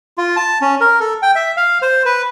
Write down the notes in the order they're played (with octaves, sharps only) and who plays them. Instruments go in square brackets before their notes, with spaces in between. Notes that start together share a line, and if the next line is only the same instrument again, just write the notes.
[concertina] F4
A5
C#4
A#4
A4
G5
E5
F5
C5
B4